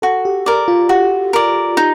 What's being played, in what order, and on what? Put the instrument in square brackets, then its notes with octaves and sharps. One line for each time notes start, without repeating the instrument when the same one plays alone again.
[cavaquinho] F#4 [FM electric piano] A4
[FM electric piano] G4
[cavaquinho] A#4 D5
[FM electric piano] F4
[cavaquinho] F#4 [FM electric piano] G4
[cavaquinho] A#4 D5
D#4